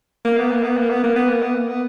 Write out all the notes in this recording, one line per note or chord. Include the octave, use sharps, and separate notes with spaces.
A#3
B3
A#3
B3
A#3
B3
A#3
B3
A#3
B3
A#3
B3